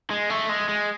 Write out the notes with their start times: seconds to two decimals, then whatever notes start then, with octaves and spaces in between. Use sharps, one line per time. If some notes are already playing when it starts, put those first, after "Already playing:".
0.10 G#3
0.30 A3
0.49 G#3
0.69 G#3